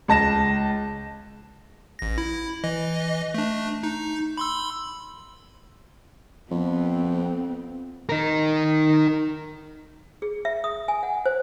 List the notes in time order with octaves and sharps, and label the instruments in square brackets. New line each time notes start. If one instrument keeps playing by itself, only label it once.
[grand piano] C#2 A5 A#6 E7
[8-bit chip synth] A1 A#6
E4
E3 D#5
A3 D4
D#4
B5 C6 E6
[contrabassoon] F2 [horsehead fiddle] B3 C4
[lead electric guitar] D#4 A#4
[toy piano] G#4
E5
D#6
G#5
F#5
C5